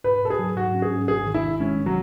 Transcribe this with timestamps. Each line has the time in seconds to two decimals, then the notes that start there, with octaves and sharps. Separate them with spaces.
0.04 G#2 B4
0.22 G#2 A4
0.30 G#4
0.39 F#3
0.56 G#2 F#4
0.74 C#4
0.82 G#4
0.91 C#4
1.08 G#1 G#4
1.26 D#3
1.34 E4
1.43 G#2
1.60 G#3 C#4
1.77 G#2
1.86 F#3